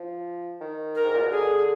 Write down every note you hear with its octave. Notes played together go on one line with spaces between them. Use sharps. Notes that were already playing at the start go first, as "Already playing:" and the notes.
Already playing: F3
D#3
A#4
G#2
A#2
B2
D3 G#4